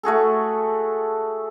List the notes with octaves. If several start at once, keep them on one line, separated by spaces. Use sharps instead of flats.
A3 F#4 G#4 A4